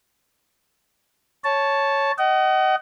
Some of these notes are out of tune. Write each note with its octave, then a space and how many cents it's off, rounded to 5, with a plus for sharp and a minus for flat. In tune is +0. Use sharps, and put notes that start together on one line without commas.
C#5 +0 A5 -5
D#5 +0 F#5 +40